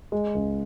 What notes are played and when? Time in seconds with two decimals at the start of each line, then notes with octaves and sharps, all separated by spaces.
0.12 G#3
0.35 C#2